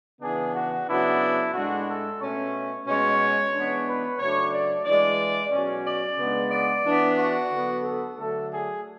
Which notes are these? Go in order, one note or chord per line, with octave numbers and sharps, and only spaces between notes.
C#3 E3 B3 D4 G#4
F#4
C#3 F#3 B3 D4 E4
A2 G#3 D4 F#4
A4
B2 A3 C#4 C#5
B2 G#3 C#4 C#5
E3 G#3 B3 D4
B4
C#3 F#3 A3 D4 C#5
D5
E3 G#3 D4 D5
B2 F#3 C#4
D5
C#3 G#3 B3 D4
D5
E3 B3 D4
F#4
D3 F#3 B3
A4
D3 F#3 A3 D4 A4
G#4